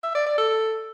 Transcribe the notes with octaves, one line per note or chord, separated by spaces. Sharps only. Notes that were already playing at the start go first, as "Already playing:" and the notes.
E5
D5
D5
A4